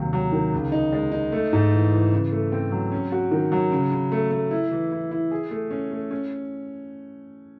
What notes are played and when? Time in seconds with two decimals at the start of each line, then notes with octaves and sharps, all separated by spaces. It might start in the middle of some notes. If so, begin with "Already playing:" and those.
Already playing: D#2 C3 F#3
0.13 F#3
0.32 D#3
0.53 C#2
0.72 D#4
0.93 G#3
1.12 D#4
1.32 A3
1.53 G#2
1.73 E3
1.92 E3
2.12 C#3
2.32 A3
2.52 C4
2.72 F#3
2.92 C#4
3.12 F#4
3.32 D#3
3.52 F#3
3.72 C#3
3.92 C#3
4.12 A3
4.31 A3
4.51 E4
4.71 E3
4.91 E4
5.11 E4
5.31 G#4
5.51 A3
5.71 C#4
5.91 A3
6.11 C#4